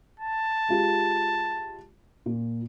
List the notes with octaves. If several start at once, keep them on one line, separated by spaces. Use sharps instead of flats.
A5
G#3 F4 G4
A#2